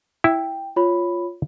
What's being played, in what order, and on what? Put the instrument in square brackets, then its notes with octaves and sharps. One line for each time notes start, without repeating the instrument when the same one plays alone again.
[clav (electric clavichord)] E4 [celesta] G5
[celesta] F4 C#5 B5